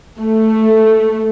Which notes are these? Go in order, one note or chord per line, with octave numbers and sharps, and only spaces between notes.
A3